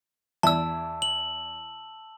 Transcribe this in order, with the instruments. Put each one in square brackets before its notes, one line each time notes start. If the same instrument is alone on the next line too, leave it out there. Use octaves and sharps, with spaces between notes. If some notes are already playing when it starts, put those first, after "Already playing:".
[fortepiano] E2 E4 D5 [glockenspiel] A5 E6
[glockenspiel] F#7